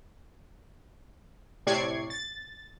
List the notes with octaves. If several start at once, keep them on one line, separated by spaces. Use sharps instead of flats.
A2 C3 D5 C#6 G#6 C7
A6